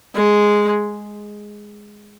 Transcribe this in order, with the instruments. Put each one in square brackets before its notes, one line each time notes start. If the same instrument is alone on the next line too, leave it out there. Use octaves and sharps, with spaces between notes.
[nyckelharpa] G#3